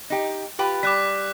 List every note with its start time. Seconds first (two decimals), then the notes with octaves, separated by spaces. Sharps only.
0.10 D#4 G4
0.59 F4 G4 B4
0.83 G3 D6 F#6 B6